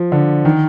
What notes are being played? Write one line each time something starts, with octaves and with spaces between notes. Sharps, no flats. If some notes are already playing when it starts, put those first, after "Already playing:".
Already playing: F3
D3
D#3